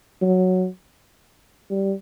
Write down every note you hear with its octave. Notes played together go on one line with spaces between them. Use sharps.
F#3
G3